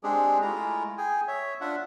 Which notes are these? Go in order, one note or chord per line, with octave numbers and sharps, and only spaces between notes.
G#3 C4 D4 G4 G#4
G#3 A3 E4 F4 A#5
G#4 G5 G#5
C#5 E5
D4 F4 E5 F#5